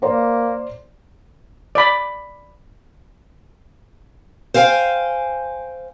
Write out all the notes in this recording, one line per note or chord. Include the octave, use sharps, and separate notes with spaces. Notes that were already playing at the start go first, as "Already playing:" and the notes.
A#3 C5 D5 A#5
D5 B5
C5 F5 G5 G#5